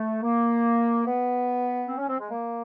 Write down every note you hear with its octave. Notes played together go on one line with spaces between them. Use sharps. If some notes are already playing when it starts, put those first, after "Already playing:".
Already playing: A3
A#3
B3
C4
C#4
C4
G#3
A#3